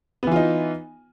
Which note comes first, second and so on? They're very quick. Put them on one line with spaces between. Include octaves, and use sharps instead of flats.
B3 E3 F4 D#4